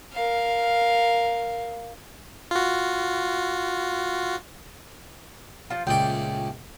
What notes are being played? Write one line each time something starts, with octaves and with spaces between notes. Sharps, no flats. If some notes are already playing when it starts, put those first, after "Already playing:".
A#4 F5
F4 F#4
F3 F4
C#2 A#2 A3 D5 G5